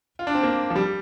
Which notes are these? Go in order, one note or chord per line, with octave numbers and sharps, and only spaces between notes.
F4
D4
C4
A#3
F3
G3